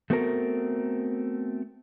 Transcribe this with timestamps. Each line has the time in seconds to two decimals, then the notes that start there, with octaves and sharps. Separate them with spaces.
0.10 A3 B3 C4 F#4 A4 A#4